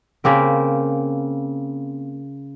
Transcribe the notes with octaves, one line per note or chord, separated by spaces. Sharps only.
C#3 A#3 C4 A#4